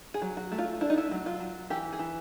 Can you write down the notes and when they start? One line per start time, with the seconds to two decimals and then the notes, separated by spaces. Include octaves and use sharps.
0.14 G#4
0.22 F#3
0.37 F#4
0.52 A3
0.59 F4
0.81 D4 E4
0.90 D#4
0.98 E4
1.11 F#3
1.26 F4
1.40 F#3
1.70 E3 G4
1.92 G#4
1.99 E3